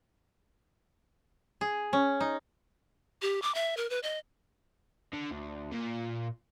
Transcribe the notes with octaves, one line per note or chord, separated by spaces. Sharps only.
G#4
C#4
D#4
G4
D6
E5
A#4
B4
D#5
D3
D2
A#2